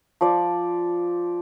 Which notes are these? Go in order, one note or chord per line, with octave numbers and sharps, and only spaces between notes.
F3 D5